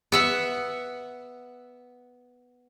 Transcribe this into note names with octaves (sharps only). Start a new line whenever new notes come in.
B3 E5 F#5